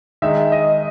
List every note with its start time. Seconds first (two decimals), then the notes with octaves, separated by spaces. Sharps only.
0.22 D#3 G#3 D#4 E5
0.52 D#5